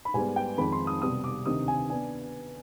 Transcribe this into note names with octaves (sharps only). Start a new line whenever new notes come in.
B5
G#2 G3 B3 G#5
G5
F2 D#3 G#3 B5
C6
D#6
C2 B2 G3 D#6
D6
D2 C3 D#3 D#6
G#5
B3 D4 G#5